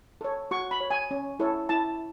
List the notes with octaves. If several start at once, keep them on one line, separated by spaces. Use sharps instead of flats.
A4 C#5
F#4 C#6
B5
C#5
G#5
C#4
E4 A4 C#5
E4 A5